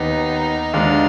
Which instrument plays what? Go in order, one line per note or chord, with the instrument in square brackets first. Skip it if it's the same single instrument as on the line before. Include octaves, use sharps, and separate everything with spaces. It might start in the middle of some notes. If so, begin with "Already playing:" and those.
Already playing: [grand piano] D#2 D#3 B3 [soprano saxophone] D#4
[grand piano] D#2 D3 G#3 D4 [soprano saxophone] F4